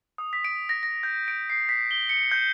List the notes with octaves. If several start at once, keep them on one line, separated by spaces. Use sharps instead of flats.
D#6
B6
D7
A#6
A#6
G6
D7
C7
B6
G7
C#7
G6